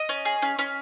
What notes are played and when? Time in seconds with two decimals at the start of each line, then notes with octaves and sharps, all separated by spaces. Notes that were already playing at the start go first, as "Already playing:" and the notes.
Already playing: D#5
0.09 C#4
0.25 G#4
0.42 C#4
0.59 C#4